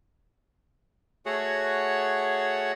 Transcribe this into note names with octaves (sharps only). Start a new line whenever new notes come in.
A3 F#4 G#4 C#5 F#5